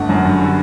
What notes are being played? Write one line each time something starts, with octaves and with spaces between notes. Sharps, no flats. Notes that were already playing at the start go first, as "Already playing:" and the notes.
Already playing: G1 D3 A3 F#5
F#2
G2
D3